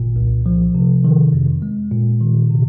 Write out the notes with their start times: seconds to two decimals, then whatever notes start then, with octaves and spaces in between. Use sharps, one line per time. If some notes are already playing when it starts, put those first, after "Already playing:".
Already playing: G#1 A#2
0.16 C2
0.46 F3
0.75 C3
1.04 D#3
1.33 F2
1.62 G#3
1.92 A#2
2.21 D#3
2.51 C3